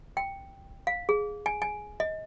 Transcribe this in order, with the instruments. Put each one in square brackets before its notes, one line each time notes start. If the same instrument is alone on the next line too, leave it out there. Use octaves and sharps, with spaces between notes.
[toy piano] G5
F5
G#4
G#5
G#5
D#5